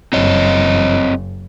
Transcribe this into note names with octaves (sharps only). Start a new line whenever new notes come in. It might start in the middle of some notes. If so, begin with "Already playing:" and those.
F#1 C4 C#5 D#5